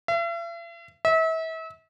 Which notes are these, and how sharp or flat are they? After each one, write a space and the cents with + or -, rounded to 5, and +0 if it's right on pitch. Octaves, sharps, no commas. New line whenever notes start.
E5 +45
E5 -35